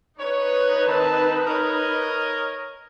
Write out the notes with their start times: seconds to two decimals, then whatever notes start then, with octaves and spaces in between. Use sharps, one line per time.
0.19 D#4 B4 C#5
0.87 D#3 C4 A5
1.48 A#4 C#5 D#5